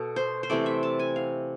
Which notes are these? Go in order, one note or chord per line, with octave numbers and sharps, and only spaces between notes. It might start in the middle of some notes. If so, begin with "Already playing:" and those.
Already playing: B2 A4
C5
C5
C3 E3 A3 C4 D5
E5
A5
G#5
F5